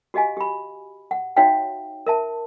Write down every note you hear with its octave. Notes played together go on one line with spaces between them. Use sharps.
F#4 G4 D#5 F5 G#5
G4 B5
F#5
D#4 F#4 C#5 E5 F5 G5
A#4 E5 A5